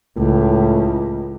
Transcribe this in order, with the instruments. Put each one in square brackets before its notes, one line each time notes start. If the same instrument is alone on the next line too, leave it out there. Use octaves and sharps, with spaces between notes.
[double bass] C#2 [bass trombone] A2